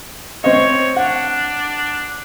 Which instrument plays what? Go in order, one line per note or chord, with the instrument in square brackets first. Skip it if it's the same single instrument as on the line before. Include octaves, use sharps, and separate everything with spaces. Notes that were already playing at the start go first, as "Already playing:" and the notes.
[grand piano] C4 C5 D#5 [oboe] C#5
[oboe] D4 [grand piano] F#5